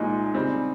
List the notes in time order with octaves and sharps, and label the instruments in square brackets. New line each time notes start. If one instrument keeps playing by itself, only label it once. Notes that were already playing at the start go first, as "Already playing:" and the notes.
Already playing: [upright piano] C2 A#2 F3 G#3 [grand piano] D#4
[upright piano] C#3 G3 C4